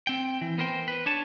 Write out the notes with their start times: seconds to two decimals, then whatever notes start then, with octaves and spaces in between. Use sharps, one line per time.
0.07 C4 G5
0.41 E3
0.58 B3 A#4 C5 G5
0.88 B4
1.06 D4 C#5 A5